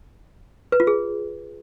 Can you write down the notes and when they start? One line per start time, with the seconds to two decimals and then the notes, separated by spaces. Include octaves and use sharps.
0.72 B4
0.80 F4
0.87 G#4